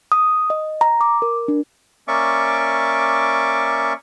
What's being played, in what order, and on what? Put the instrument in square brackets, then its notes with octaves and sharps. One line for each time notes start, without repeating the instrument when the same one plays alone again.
[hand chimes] D#6
D#5
A#5
D6
A#4
D4
[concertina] A#3 C#4 D5 E5 C#6 D6